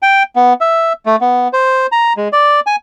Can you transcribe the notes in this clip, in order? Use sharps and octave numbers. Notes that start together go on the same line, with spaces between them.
G5
B3
E5
A3
B3
C5
A#5
G#3
D5
G#5